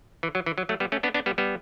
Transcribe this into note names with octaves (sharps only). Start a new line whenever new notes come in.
E3
F#3
E3
F#3
F#3 A3
G3 B3
A3 C#4
B3 D4
B3 D4
G3 B3
G3 B3